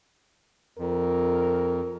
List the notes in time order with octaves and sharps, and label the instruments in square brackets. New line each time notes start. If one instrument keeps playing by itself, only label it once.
[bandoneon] F2 [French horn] A#4